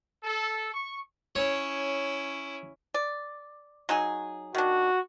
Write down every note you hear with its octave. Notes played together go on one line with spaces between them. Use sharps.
A4
C#6
C#4 E4 C#5
D5
F#3 D#4 G#4
D#3 D4 F#4